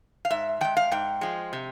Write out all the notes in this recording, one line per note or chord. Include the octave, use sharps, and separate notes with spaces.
F5
G#2 E5
F3 G#3 G5
F5
G#2 G5
F3 G#3
C3